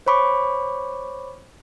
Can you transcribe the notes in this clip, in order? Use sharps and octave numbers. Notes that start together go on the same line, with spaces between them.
C5 C#5 B5 C#6 D6